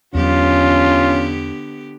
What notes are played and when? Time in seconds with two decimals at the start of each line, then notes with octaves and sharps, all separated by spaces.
0.14 E2 D3 F#3 B3 C#4 F4 G4